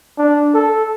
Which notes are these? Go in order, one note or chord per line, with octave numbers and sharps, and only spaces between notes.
D4
A4